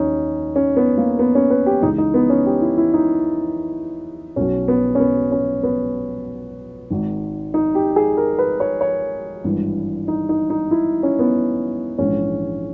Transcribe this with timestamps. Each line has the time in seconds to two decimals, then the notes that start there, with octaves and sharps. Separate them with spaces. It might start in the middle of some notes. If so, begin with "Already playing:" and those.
Already playing: D#2 D#3 C#4 D#4
0.56 C#4
0.77 B3
0.98 A#3
1.19 B3
1.35 C#4
1.50 B4
1.66 G4
1.82 C#2 C#3 E3 D#4
1.98 D#4
2.14 B3
2.30 C#4
2.46 G4
2.62 E4
2.78 E4
2.94 D#4
4.36 B1 B2 C#4
4.68 B3
4.95 C#4
5.00 B3
5.32 C#4
5.63 B3
6.90 G#1 G#2 D#3
7.54 D#4
7.75 G4
7.96 G#4
8.17 A#4
8.39 B4
8.60 C#5
8.81 C#5
9.44 G#1 G2 E3
10.08 D#4
10.29 D#4
10.50 D#4
10.71 E4
11.03 C#4
11.19 B3
11.98 A#1 G#2 E3 C#4